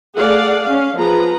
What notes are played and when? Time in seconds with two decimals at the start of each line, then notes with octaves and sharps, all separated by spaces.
0.17 A3 G#4 D5 F5 F#5
0.63 C#4 F5
0.98 F3 B3 G#4 B4 A#5